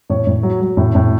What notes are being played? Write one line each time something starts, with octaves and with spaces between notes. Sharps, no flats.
A2 C#5
A2
F#3
F#3
A2
A2